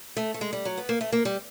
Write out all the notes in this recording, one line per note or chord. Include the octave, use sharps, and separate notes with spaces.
A3
A3
G#3
G3
F#3
B3
A#3
A3
A#3
G3